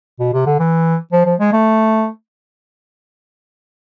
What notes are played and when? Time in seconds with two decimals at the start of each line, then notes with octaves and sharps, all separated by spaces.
0.20 B2
0.33 C3
0.46 D3
0.59 E3
1.12 F3
1.25 F3
1.40 G#3
1.53 A3